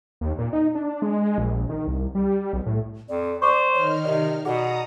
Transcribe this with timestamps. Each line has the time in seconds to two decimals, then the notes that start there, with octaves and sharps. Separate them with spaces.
0.21 D#2
0.39 A#2
0.53 D#4
0.75 D4
1.02 G#3
1.38 A#1
1.69 D#3
1.87 C2
2.15 G3
2.53 B1
2.66 A2
3.09 F2 D5
3.42 C5 D5 C#6 D6
3.74 D#3 D#4 C#5 F6
4.05 C3 D5 D#5
4.45 B2 G#4 D5 F#5 A#5 D#6